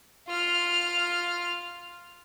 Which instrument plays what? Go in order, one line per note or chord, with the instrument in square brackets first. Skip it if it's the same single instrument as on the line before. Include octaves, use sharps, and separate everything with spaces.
[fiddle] F4 F6